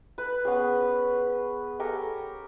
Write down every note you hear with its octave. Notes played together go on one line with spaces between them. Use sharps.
B4
B3 C#4 G#4
G4 A4 A#4 G#5